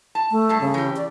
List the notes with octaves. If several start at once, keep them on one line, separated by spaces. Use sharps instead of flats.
A5
A3
G2 A5
C#3
E3 G4
D5